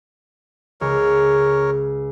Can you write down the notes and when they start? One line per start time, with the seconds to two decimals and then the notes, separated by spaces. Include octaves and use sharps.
0.81 C#2 A#4 C#5